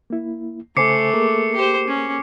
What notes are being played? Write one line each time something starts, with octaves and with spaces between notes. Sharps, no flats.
A#3 E4
C#3 A3 C5 G#5 D6 C7 C#7
A#3 G#4 A#4
G4 C5
C#4